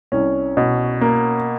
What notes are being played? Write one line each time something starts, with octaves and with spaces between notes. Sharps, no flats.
C2 C#4
B2
A#3